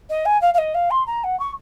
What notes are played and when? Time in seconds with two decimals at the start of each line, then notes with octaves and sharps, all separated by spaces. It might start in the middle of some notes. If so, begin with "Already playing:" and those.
0.10 D#5
0.25 G#5
0.41 F5
0.54 F5
0.58 D#5
0.74 F5
0.91 C6
1.07 A#5
1.24 F#5
1.39 C#6